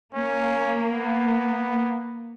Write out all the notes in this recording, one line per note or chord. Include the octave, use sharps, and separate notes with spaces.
A#3 C#4
B3